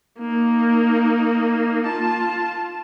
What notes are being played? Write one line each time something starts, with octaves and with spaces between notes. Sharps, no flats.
A#3 D#4
F4 A5